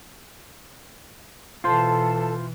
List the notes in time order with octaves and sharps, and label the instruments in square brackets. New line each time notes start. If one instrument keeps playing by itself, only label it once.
[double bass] B2 E3 [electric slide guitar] F4 C5 [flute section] A4 A5